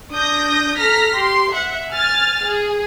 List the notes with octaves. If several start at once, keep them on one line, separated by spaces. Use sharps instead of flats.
D4 D#6 G6 A#6
A4 A#5 F6 A#6 B6
G4 C6
E5 F#5
G#5 F6 A6
G#4